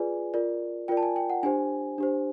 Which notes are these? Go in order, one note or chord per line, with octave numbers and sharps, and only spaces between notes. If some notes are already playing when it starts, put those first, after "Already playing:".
Already playing: F4 G#4 B4 D5 G#5
F4 A#4 D5
F4 A#4 D5 G5
A5
G#5
G5
F#5
D4 G4 C5 G#5
D4 G4 C5